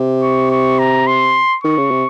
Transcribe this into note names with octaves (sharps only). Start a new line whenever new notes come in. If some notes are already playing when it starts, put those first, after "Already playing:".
Already playing: C3
C#6
C#6
A#5
C6
D#3 C#6
C#3
C3